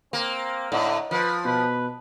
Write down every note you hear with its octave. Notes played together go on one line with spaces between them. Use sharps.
A#3 C4
A2 D3 C#5 D#5 F#5
F3 B4
B2 B4